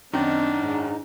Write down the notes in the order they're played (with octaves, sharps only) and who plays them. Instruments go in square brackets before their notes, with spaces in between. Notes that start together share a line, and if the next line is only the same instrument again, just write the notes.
[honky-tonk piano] F#2 D#3 [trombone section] C4 [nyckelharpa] D4 [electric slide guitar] D#4
[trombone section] G#2